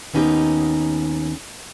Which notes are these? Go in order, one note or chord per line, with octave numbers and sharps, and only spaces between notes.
D#2 B3 C#4 D#4 G4